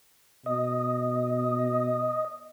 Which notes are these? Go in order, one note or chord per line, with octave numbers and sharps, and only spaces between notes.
B2 D#5